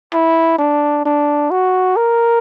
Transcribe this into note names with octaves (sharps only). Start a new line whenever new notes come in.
E4
D4
D4
F#4
A#4